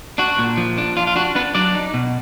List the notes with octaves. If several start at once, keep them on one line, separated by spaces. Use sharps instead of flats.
D4 F#4
A#2
F3
D4
D4 F4
F4
D4 F#4
B3 D4 B4
F#3 D4 D5
D#4
B2